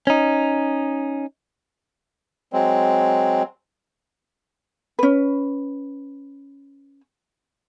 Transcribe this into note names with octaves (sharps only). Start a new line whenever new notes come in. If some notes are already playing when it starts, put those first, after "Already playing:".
C#4 D#4
F#3 G#3 C4
C#4 B4